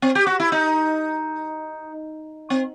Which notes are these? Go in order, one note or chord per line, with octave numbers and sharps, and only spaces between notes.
C4
G4
F#4
E4
D#4
C4